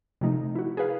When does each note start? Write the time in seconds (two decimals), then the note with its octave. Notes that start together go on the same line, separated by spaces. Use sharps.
0.21 C3 F3 A3 D#4
0.55 E4 F#4
0.77 G#4 A#4 B4 F5